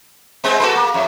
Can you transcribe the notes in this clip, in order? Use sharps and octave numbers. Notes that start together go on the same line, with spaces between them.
G#3 B3 C4
F#4 A4 B4
A#3
F2